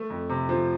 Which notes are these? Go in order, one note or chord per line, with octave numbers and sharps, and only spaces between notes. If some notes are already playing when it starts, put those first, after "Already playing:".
Already playing: A3
F2
C3
F3